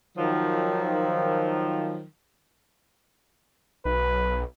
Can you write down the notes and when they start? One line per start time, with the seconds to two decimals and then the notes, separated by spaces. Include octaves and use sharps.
0.18 D#3 F3 F#3
3.85 B1 B4